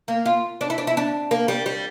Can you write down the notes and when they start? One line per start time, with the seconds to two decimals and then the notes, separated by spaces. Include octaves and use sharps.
0.08 A#3
0.26 F4
0.61 D4
0.70 E4
0.78 D4
0.87 E4
0.97 D4
1.31 A#3
1.48 G3
1.66 G3